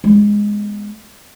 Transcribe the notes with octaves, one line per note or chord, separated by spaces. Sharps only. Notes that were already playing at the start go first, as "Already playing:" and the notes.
G#3 B3